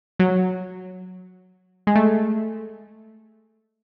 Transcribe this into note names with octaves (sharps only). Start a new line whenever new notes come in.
F#3
G#3
A3